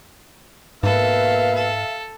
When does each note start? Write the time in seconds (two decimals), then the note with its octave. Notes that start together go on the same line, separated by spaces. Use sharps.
0.83 G#2 B2 A#3 A4 B4 E5 F5
1.55 A4